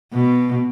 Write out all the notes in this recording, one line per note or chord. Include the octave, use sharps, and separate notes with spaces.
B2